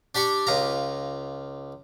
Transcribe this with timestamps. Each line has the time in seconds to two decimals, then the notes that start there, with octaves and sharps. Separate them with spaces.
0.15 D4 G4 D5 C#6
0.47 C#2 F4 A#5